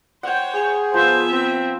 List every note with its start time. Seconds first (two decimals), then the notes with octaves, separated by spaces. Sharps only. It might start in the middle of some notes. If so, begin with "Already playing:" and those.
0.23 C5 C#5 F#5 G5
0.55 G#4
0.94 F3 B3 C5 E5
1.31 C4